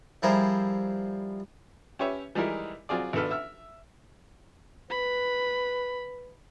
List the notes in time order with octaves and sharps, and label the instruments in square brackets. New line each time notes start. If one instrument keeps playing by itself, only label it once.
[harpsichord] F3 G3 E4 G#4 A#4 C5
[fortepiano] C#4 G4 B4 C#5 E5
E3 G3 G#3 D#4 E4 A#4
F#3 C4 F4 G#4 D5
G#1 B3 D4 A4 B4 F6
E5 E6 F6
[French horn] B4 [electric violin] B5